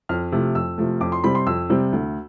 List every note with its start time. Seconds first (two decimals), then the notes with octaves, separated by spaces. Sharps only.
0.09 F2 F6
0.32 C3 F3 A3
0.55 F2 E6
0.78 C3 F3 A3
1.01 F2 D6
1.12 C6
1.23 C3 G3 C4 B5
1.35 C6
1.46 F2 E6
1.69 C3 G3 C4
1.93 D2